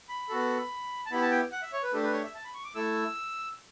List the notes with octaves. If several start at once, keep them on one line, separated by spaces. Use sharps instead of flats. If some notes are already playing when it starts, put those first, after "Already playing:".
B5
B3 F#4 A4
A5
B3 E4 G4 B5
A5
G5
F#5
E5
C#5
B4
A3 D4 G4 A4
B4
C#5
E5
A5
B5
C#6
D6
A3 E4 A4 E6